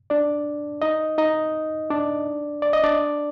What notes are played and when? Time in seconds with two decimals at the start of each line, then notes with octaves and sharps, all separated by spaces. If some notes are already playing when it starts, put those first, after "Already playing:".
0.10 D4 D5
0.82 D#4 D#5
1.18 D#4 D#5
1.90 D4 D5
2.62 D5
2.73 D#5
2.83 D4 D5